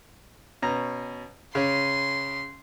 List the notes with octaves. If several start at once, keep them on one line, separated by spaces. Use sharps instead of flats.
B2 C#4 A#5
C#3 C#4 C6